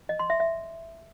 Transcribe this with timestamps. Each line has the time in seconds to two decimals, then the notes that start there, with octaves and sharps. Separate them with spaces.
0.09 D#5
0.19 C6
0.30 E5
0.40 E5